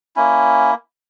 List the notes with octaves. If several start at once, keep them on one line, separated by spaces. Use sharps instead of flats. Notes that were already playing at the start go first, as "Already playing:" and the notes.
A#3 C#4 E4